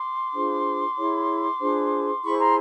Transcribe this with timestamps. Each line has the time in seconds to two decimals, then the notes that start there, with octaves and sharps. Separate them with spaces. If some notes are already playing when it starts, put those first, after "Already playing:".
Already playing: C6 D6
0.34 D4 F4 G#4 C5
0.97 E4 G#4 C#5
1.60 D4 F4 G#4 C5
2.23 E4 G#4 C5 B5 C#6
2.38 A#5 C6